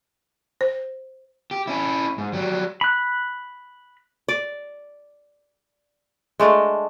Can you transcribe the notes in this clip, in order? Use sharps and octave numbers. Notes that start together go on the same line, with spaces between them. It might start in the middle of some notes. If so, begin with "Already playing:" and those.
C5
G4
C#4 E4
G#2
F#3 G3
B5 F#6
D5
G#3 A3 D4 D#5